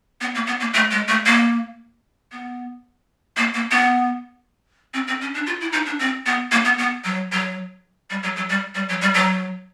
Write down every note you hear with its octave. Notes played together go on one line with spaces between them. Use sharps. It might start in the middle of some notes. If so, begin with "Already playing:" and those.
B3
A#3
B3
A#3
A3
G#3
A3
A#3
B3
A#3
A#3
B3
C4
C4
C#4
D4
F4
E4
D#4
D4
C4
B3
A#3
B3
B3
F#3
F#3
G3
F#3
F#3
G3
G3
F#3
G3
F#3